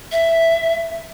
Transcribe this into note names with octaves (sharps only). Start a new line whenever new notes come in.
E5